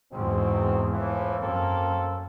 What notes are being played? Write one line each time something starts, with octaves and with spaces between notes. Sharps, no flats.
E2 G#2 B2 C4
A2 E3 F3
F#2 A#3 C4 A4